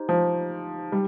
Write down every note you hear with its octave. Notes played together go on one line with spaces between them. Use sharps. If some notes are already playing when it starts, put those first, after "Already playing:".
Already playing: D#4 G4 C5
F3
G3